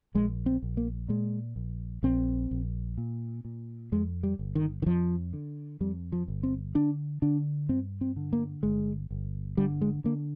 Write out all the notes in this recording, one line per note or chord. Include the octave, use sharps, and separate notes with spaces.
A#1 G#3
C4
A#1
A#3
A#2 G#3
A#1
A#1 C4
A#1
A#2
A#2
F2 G#3
G3
G1
D#3
D#3
F2 F3
D3
F2 G3
F3
G1
C4
D3 D4
D3 D4
G2 C4
C4
D3
A#3
G1 G#3
G1
D3 G3
G#3
D3 A#3